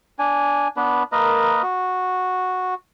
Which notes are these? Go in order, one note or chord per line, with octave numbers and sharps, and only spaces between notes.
D4 G#5
B3 D4 B4
A#3 A#4 B4 D#5
F#4